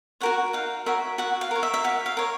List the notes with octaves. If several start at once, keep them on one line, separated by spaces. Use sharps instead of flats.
F#4 A#4 C#5 F#5
D#4 F5
F#4 A#4 C#5 E5
F#4 F#5
F5
A#4 C#5
E5
E5
F#4 F5
F5
A#4 C#5